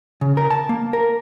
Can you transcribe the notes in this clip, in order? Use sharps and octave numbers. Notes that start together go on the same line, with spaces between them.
C#3
A#4
A5
A#3
A#4